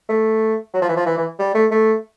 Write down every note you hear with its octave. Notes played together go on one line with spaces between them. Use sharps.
A3
F#3
F3
E3
F3
E3
E3
G3
A3
A3